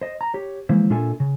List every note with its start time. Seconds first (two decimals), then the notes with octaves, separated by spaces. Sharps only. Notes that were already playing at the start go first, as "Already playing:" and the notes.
0.01 C5 D#5
0.21 A#5
0.34 G4 C#5
0.69 E3 F3 G#3 A#3 E4 C5
0.90 A#2 D4 F4 A4 E5 G#5
1.20 C#3